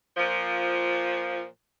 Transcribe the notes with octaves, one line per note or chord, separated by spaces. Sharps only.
A#2 F3